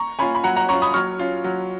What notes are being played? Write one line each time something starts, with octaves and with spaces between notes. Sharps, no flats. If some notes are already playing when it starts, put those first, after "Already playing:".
Already playing: A#5 C#6
C#4 F4 G#5 B5
B5
F#3 F#5 A#5
F#5 A#5
C#4 F4 A#5 C#6
B5 D#6
F#3 C#6 F6
C#4 F4
F#3